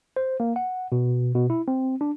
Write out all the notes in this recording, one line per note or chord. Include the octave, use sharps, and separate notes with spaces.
C5
A#3
F#5
B2
B2
E4
C4
D4